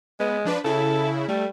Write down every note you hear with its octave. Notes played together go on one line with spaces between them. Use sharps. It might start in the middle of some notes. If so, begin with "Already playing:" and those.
G#3 B3
F3 D4 B4
C#3 E4 A4
G3 A3